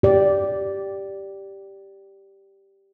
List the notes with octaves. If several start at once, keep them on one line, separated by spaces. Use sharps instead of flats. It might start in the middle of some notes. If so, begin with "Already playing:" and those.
G4 D5